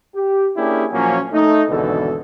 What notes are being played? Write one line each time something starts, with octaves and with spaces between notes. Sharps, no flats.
G4
A#3 C#4 D4 E4 G4 G#4
A#2 F3 F#3 A#3 C#4
A3 D#4
G#1 E2 B2 D3 E3 A4